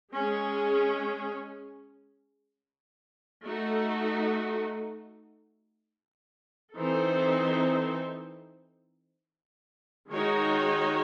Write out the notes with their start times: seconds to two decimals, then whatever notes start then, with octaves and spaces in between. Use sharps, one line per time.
0.13 G#3 C#4 G#4
3.45 A3 D#4 F#4 A4
6.77 E3 C4 D#4 A4 C5
10.10 D#3 G#3 D#4 F#4 C#5